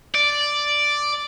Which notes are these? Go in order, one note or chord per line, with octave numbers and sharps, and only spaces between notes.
D5